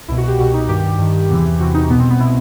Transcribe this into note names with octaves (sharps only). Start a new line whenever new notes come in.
C2 B2 E4
F#4
G4
C2 B2 F#4
D#4
G2 D#3 G4
G2 D#3
E2 C3 E3
E2 C3 E3 F#4
D#4
C2 B2 B3
C4
B3
B2 E4